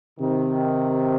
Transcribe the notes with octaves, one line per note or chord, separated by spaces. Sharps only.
C3 D#3